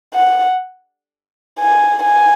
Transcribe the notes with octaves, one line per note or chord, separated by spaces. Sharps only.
F#5
G#5
G#5